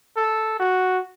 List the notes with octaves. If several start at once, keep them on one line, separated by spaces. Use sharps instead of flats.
A4
F#4